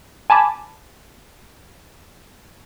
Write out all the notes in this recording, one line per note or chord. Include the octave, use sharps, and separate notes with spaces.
G#5 A5 B5 D6